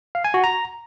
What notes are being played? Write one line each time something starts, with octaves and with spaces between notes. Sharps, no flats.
F5
G#5
F#4
A#5